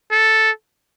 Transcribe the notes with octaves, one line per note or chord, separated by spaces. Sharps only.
A4